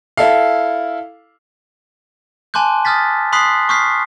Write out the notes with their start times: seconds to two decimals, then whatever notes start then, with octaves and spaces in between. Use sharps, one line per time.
0.17 E4 A4 F5
2.54 G#5 A5 C6 D6 F#6 G6
2.85 D#6 F6 G6 A6 B6
3.32 B5 C6 D#6 F#6 B6 C7
3.69 C#6 D#6 F6 G6 B6 C7